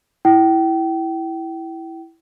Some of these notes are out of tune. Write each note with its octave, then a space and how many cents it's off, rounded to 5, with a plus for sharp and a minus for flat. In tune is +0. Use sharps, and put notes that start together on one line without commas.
E4 +0 G5 -30